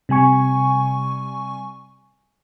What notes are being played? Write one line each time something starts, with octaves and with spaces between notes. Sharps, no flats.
C3 G3 G#5 C#6